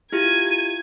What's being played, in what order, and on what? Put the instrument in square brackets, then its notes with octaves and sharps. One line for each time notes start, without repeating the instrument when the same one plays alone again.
[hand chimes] E4 F4 G4 [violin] G#6 D#7